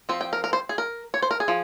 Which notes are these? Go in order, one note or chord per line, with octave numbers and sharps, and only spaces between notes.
F3 C4
G5
A#4
A#4
C5
G#4
A#4
C#5
C5
A#4
G#4
F3